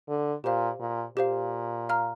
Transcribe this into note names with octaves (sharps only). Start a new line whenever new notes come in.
D3
A#2 G4 C5 F5
A#2
A#2 G4 C5 F5
F5 A#5 F6